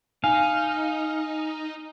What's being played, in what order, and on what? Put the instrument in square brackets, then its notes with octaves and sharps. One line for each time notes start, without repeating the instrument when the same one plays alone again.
[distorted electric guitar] D#4 [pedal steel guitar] F5 [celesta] G#5